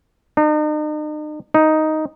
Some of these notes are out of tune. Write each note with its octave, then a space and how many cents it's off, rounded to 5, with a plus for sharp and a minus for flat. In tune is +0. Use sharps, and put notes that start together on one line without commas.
D#4 -40
D#4 +5